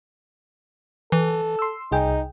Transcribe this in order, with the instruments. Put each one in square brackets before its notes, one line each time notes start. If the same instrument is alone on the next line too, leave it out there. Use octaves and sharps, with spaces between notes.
[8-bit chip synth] E3 [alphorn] A4
[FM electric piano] C6 E6
[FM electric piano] C2 G#4 G5 [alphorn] D#4